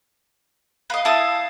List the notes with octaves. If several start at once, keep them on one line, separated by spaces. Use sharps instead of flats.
B4 D#5 F5
E4 A5 D#6